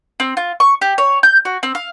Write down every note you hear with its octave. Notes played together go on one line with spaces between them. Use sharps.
C4
F4
C#6
G4
C#5
G6
F#4
C4
F5